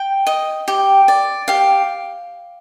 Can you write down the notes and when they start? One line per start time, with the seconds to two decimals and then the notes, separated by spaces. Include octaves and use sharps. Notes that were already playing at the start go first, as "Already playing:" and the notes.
Already playing: G5
0.27 D#5
0.68 G4
1.08 D5
1.48 G4 F5